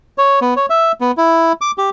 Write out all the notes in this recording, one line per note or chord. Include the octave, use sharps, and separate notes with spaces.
C#5
B3
C#5
E5
B3
E4
D6
G4